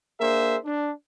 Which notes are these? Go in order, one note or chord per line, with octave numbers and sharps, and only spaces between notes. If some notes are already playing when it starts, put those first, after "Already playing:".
A#3 D4 G#4 A#4 C5 E5
D4